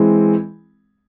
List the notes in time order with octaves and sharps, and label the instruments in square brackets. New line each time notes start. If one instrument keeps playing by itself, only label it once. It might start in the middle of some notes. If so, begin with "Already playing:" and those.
Already playing: [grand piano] E3 G#3 C4